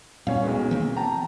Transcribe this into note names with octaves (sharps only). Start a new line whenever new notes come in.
A#2 G3 B3 C#4 F5
B1 G#3 B3
E3 A#3 C4
G5 A5 A#5